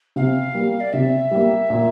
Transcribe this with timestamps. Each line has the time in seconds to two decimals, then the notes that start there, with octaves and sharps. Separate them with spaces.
0.16 C3 F5
0.55 G3 A#3
0.80 D5
0.93 C3 E5
1.31 G3 A#3
1.70 A#2